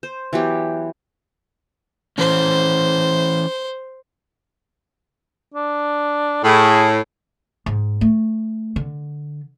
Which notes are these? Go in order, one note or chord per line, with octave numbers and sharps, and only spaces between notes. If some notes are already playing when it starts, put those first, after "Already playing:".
C5
E3 F#3 B3 G4
E3 C#4 C5
D4
A2 G#4
G#2
A3
D3